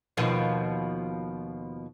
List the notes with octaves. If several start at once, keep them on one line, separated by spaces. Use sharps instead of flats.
D#2 B2 F3